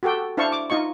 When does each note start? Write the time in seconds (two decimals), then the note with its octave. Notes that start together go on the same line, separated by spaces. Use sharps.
0.03 F#4 G4 A4 G5
0.37 D4 E4 C5 F5 A5 C#6
0.52 D6
0.70 D#4 F4 D#5 C#6